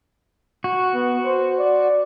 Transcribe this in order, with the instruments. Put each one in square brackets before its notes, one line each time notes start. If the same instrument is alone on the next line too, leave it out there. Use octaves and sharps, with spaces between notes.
[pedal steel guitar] F#4
[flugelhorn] B3
C5
D5